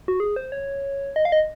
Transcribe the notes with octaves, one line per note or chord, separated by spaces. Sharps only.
F#4
G#4
C5
C#5
D#5
F5
D#5